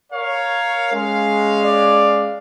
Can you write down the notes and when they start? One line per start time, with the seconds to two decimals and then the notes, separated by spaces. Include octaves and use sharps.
0.12 A#4 C#5 F5
0.92 G#3 C#4 F5
1.63 D5